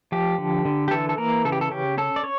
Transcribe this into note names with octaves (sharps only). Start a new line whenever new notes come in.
F3 G4
D3
D3
G4
E3 A4
A4
E3 A#3 A#4
C#3 A4
G4
A4
C#4 G4
C#4 A4
D5
C#4 C#5